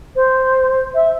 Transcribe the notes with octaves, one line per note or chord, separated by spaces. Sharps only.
C5
E5